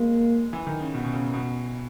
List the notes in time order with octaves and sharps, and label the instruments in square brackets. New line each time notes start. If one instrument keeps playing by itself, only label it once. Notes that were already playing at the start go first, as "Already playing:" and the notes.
Already playing: [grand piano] G#3 [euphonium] A#3
[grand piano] E3
D#3
C#3
B2
B2
C#3
B2